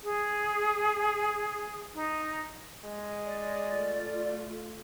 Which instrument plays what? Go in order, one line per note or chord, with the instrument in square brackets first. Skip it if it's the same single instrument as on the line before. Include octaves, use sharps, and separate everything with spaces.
[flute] G#4
D#4
[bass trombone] G#3
[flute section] D5
[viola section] A3 F4